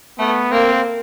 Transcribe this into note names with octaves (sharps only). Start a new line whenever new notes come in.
A3 B3
A#3 C4